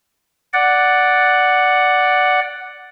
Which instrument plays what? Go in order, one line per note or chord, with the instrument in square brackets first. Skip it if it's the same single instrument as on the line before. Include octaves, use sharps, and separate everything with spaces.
[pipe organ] D5 F#5